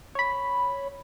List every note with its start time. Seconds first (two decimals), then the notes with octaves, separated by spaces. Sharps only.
0.15 C#5 B5